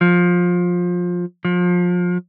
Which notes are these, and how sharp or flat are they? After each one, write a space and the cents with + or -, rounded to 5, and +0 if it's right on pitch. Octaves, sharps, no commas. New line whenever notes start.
F3 +20
F3 +30